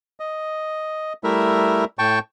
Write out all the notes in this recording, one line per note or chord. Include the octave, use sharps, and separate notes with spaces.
D#5
G3 A3 E4 A#4 E5
A2 G5 A5 C#6